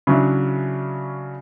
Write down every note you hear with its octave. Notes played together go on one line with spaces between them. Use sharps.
C#3 F#3 C#4 D4 E4